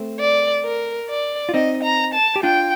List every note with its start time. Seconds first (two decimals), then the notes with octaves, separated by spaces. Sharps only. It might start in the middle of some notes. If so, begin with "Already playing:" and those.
Already playing: A3 C4
0.20 D5
0.64 A#4
1.09 D5
1.49 F4
1.54 C4 D#4 D#5
1.84 A#5
2.14 A5
2.36 G4
2.43 D4 F4 G5